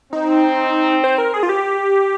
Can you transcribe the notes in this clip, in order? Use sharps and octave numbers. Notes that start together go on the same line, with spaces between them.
C4 D#4
C5
A#4
G#4
F4
G4